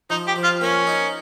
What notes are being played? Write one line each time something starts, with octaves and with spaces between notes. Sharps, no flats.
F3 D#4
G4
F3
F4
A#3 C#4
D#4